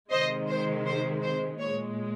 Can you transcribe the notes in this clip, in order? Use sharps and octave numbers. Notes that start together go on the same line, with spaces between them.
C3 D#3 G#3 C5 D#5
C5
C5
C5
A#2 G#3 C#5